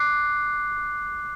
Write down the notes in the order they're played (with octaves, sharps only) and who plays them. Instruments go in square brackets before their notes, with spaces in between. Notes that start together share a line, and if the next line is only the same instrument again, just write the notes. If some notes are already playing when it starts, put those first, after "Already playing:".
Already playing: [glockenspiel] D6 F#6 C7